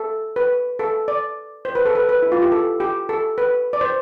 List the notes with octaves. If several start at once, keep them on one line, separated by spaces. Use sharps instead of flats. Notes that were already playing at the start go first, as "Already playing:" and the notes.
Already playing: A4
B4
A4
D5
C5
B4
A4
B4
B4
E4
F4
G4
A4
G4
A4
B4
D5
C5